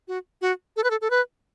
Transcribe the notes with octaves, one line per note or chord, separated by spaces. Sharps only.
F#4
F#4
A4
B4
A4
A4
B4